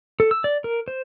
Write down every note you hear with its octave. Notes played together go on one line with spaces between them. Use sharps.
A4
E6
D5
A#4
C5